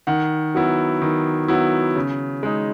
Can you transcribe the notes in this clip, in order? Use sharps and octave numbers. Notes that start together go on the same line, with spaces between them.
D#3 F#5
F#3 B3 E4
D#3
F#3 B3 E4
C#3
G#3 D#4